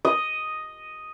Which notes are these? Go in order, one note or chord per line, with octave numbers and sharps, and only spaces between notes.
D#5